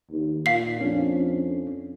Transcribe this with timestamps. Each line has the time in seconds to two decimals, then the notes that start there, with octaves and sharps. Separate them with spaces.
0.11 D#2
0.46 A#2 F5 C7
0.81 F2 C#4 D4